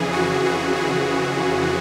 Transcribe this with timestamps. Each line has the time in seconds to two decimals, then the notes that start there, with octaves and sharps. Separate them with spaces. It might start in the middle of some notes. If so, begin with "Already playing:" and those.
Already playing: F2 C#3 E3 G#4
0.13 F#4
0.44 G#4
0.76 G#4